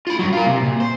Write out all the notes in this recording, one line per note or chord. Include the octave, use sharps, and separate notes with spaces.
F4 B5
G2 F#3
F4 A#4
C3
A#2
C5